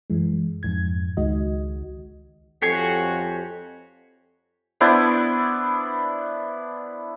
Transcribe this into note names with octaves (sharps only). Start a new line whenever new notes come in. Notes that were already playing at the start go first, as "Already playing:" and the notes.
F#2 E3 G#3
F2 G#2 G#6
C#2 D#3 G#3 F#4 D#5
F2 F#4 G4 A4 C#5 G#5 C7
B3 D4 E4 C5